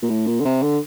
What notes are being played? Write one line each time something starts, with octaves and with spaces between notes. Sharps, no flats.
A#2
A2
A#2
D3
C3
D3